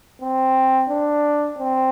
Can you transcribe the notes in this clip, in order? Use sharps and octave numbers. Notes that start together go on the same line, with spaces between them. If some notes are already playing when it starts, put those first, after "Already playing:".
C4
D4
C4